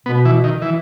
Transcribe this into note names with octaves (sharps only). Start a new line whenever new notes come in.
B2 B3
E3
D#3
E3